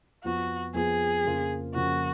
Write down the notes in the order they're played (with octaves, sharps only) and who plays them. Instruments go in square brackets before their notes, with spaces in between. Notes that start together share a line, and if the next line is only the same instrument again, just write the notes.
[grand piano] F2 F3 B3 F4 [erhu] F#4
[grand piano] F2 F3 B3 F4 [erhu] G#4
[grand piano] F2 C#3 F3 A#3 F4
[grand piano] F2 C#3 F3 A#3 F4 [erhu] F#4